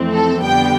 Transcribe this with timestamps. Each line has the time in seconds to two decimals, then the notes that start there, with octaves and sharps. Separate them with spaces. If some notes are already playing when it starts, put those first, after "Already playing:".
Already playing: F2 E3 A3 C4
0.12 A4
0.42 F2 D3 G3 B3 G5